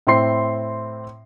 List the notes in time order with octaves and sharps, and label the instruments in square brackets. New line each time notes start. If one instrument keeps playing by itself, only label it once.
[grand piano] A2 C4 E4 C6 C7